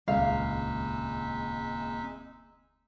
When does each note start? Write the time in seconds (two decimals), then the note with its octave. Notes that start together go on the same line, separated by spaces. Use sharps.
0.08 D#1 C#2 G#3 A#3 C4 D#4 E5 F5